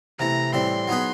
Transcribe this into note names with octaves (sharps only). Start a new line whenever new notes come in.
C3 E3 A3 A#5
A2 E3 G3 C4 C6
F#3 B3 D#4 G#4 B4